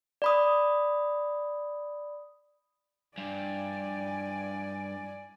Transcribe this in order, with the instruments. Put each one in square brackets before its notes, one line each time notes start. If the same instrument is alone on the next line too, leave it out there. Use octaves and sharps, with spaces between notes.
[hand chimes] D5 B5 D#6
[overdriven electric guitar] G2 [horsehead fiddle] D5 G#5